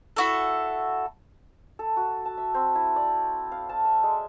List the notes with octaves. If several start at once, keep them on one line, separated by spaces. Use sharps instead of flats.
E4 F#4 A4
A4
F#4
A5
E5
C4
E4
D5
F5
A5
E5
G#3